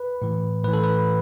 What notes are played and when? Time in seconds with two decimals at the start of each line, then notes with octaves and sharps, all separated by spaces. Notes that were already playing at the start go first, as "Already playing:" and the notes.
Already playing: B4
0.22 A2 E3
0.63 A2 E3 B4
0.73 A4
0.84 B4